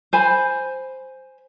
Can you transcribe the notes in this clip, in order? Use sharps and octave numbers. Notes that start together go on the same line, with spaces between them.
C5 G#5 B5